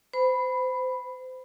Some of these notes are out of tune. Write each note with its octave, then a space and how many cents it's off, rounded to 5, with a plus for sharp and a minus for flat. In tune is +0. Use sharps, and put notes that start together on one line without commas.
C5 -25 B5 +0